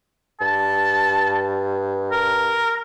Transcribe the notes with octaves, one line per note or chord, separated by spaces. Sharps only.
G2 A5
A#4